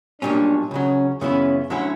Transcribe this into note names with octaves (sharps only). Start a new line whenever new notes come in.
B1 A#2 G3 C#4 D4
C#2 C#3 F#3 C#4
F#2 C#3 E3 B3 C#4 E4
D2 D3 F#3 C#4 E4